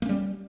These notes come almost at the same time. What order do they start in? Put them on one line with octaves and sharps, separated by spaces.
A#3 C#4 G3